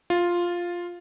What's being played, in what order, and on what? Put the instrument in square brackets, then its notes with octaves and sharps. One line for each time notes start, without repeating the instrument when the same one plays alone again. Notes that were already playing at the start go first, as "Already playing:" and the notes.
[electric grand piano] F4